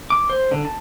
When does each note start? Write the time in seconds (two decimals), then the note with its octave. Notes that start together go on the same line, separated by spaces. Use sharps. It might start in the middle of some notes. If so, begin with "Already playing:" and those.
0.10 D6
0.30 C5
0.52 D3
0.65 A5